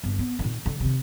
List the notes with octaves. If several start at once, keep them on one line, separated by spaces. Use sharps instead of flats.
G1
B3
A#2 D#3
D3
C3 D#3